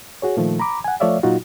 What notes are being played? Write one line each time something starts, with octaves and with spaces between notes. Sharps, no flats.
F#4 G#4 C#5
A#2 D#3 F3 A3
A#5 B5 D6
F#5 G#5
F3 A3 C#5 D5 E5 F5
A#2 F#3 D#4 F4 F#4